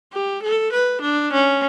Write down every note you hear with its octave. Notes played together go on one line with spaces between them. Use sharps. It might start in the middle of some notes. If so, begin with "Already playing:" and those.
G4
A4
B4
D4
C#4